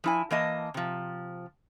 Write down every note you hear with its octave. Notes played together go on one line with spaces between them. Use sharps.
F3 E4 G#5
E3 A#3 D#5 A5
C3 F3